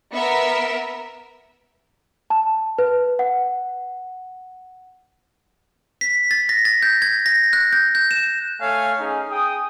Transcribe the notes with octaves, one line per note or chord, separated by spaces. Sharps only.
B3 A#4 E5
A5
B4
F#5
B6
A6
A#6
A6
G6
G#6
A#6
F#6
G6
G6
E7
A3 C#5 F5 G#5
C#4 D#4 G#4
G#4 G5 D#6